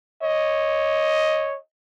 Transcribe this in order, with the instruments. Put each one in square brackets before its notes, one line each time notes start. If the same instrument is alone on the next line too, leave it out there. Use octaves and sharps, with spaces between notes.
[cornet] C#5 [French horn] D#5